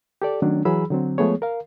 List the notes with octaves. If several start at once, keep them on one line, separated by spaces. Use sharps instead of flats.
G4 A4 D5
D#3 F#3 A3 C#4 D4
E3 F#3 G#4 B5 E6
D3 F#3 C4
F3 G#3 A3 B3 G#4 C#5
A#4 F5